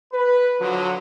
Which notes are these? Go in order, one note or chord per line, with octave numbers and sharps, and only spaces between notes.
B4
D3 F3 F#3